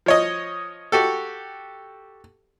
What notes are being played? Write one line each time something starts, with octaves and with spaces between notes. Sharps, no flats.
F3 C#5 D#5
F#4 G4 A4